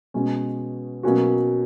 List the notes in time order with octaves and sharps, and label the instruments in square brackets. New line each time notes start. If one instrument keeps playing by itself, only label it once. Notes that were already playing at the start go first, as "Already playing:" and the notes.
[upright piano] B2 G#3 C#4
B2 F#3 A#3 C#4 F#4